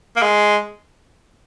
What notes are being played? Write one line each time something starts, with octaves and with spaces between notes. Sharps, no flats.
A#3
G#3